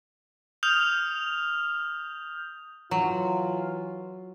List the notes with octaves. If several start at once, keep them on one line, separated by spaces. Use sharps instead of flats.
D#6 F6 G6 F7
E3 F#3 F4